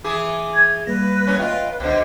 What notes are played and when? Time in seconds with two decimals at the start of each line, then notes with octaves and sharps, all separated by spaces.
0.04 E3 G#4 G#5 D6
0.53 G#6
0.87 G3 A#3 B4 A#6
1.27 F#2 C#4
1.40 F4 B4 D#5 F5 G5
1.80 C#2 B2 D3 C5